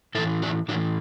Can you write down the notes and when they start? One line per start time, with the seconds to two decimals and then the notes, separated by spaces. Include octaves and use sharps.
0.15 A2 E4 A4
0.18 E3
0.42 D4 F#4
0.68 A2 E3 D4 F#4